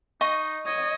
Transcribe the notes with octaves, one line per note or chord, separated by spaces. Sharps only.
D#4 D#5 C#6 D#6
C#5 D#5